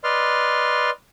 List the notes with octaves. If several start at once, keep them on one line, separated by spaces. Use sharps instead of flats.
B4 D5 D#5 C6 F6